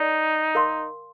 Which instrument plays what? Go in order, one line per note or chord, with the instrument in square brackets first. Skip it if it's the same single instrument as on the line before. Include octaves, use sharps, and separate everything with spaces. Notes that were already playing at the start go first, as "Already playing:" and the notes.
Already playing: [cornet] D#4 [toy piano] A#4 D5
[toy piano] A#4 F5 C6